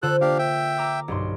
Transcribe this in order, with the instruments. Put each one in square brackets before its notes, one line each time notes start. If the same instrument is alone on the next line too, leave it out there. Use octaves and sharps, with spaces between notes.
[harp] D3 F4 C5 [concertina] A4 F#6
[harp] A#3 [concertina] D4 G4 F5
[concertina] E5 G5
[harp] A#5 D6 E6
B1 G2 C6